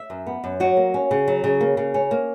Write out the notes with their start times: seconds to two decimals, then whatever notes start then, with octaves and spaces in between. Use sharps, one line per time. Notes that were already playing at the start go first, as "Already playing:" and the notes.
Already playing: E5
0.10 F#2
0.27 B3
0.44 F#2
0.60 F#3 F#4
0.77 A#3
0.94 C#4
1.11 C#3
1.28 F#3
1.44 C#3
1.61 A#3
1.77 C#3
1.94 C#4
2.11 A#3